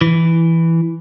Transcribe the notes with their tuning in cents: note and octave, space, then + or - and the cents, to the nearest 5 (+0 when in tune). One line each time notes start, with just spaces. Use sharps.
E3 +0